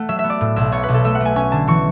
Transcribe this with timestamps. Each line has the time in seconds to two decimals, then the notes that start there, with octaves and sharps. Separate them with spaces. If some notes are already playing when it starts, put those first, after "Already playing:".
Already playing: A3 F#5
0.09 F#3 E5
0.19 E5
0.24 B3
0.30 D5
0.41 A2
0.56 B1 E5
0.72 B3 C#5
0.83 B4
0.89 B1
0.94 A4
1.04 A3 E5
1.15 F#5
1.20 A3
1.25 G#5
1.36 C#4 G#5
1.52 D3 A5
1.67 E3 C#6